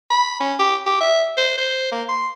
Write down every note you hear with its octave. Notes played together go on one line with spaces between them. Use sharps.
B5
C#4
G4
G4
E5
C5
C5
A#3
C6